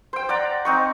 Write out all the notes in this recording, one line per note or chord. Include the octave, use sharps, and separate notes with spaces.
C5 G5
D5 F#5 A#5
C4 D#4 C#6